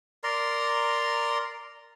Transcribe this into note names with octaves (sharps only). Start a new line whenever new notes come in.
A#4 D5 A#5 C6